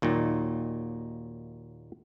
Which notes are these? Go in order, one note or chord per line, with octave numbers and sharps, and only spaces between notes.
D#2 A#2 F#3 D#4